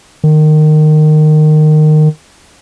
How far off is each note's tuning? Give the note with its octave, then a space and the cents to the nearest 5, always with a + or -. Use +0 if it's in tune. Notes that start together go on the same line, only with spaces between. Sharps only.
D#3 -20